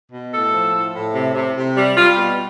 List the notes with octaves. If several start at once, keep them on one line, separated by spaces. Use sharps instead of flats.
B2
A2 A4
F3
A2
A2
C3
C3
C3
G3
G3 F4
B2